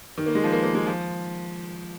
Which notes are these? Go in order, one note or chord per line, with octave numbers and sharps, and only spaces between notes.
D#3
A#3
G#3
F3
A#3
A#3
G#3
F3